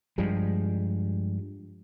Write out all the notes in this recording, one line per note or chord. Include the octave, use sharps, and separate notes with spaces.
G2 F3 G3 G#3